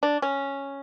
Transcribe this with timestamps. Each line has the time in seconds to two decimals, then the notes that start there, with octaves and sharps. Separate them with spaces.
0.03 D4
0.22 C#4